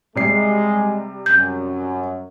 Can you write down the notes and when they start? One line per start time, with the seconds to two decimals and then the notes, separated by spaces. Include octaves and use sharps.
0.15 C3 G3 G#3 C7
1.26 F#2 G6